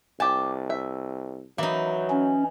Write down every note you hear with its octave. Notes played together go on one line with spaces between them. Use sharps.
C2 G4 G#5 A5
E5
E3 F#3 A#3 D#4
C#4